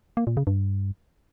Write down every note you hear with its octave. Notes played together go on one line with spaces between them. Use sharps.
A#3
A#2
C#3
G2